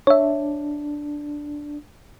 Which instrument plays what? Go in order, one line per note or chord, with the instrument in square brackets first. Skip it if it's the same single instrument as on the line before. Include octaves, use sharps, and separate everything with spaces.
[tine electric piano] D4 [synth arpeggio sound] C#5 E5